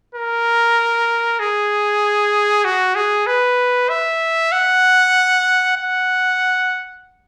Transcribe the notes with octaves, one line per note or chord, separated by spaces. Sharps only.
A#4
G#4
F#4
G#4
B4
E5
F#5
F#5